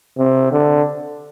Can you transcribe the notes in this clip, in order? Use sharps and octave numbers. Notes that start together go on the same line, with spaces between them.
C3
D3